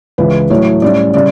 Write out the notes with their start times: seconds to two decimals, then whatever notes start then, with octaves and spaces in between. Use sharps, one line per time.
0.18 C#2 C#3 E3 B4
0.50 A2 F#3 A3 E4 C#5
0.82 A2 G3 C#4 E4 D5
1.14 C#3 G3 D5